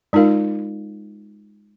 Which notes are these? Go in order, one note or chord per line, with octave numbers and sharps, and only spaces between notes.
G#3 D#4 F4 A#4 F5